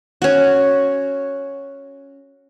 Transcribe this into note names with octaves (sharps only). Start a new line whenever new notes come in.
C#4 F#4